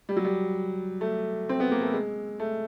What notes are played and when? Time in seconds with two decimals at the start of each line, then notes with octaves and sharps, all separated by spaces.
0.09 G3
0.16 F#3
0.25 G3
1.01 A3
1.49 C4
1.60 B3
1.71 A#3
1.82 A3
1.93 G#3
2.40 A3